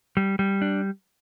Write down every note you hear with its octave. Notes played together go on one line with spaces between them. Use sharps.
G3
G3
D4